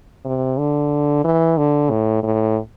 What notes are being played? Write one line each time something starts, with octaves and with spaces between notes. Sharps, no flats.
C3
D3
E3
D3
A2
A2